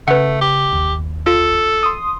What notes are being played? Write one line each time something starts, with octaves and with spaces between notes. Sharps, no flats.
C#3 A3 B4 F#5
G4
G1 D#2
F4 A4
C6 D#6